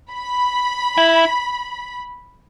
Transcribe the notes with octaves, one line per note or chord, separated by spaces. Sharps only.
B5
E4